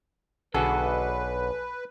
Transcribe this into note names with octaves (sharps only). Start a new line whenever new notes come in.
B1 D3 F#4 G#4 A4 B4